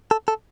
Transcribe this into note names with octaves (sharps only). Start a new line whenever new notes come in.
A4
A4